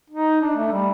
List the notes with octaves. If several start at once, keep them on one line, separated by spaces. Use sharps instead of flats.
D#4
D4
A3
G3